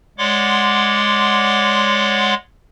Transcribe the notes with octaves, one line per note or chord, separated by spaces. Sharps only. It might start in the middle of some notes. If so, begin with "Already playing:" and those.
G#3 C#5 D5 F#5 C6 D6